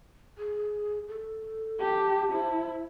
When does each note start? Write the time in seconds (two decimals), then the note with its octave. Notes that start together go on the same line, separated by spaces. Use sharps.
0.38 G#4
1.08 A4
1.80 G4 A5
2.32 E4 C5